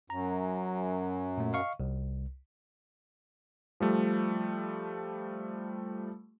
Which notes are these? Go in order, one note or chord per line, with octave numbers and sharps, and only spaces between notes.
F#2 A#5
A#2 A3
D#5 F5 C#6
C2
F3 G3 A3